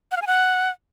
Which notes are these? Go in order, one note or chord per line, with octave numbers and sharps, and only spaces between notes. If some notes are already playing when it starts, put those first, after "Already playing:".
F#5
F5
G#5
F#5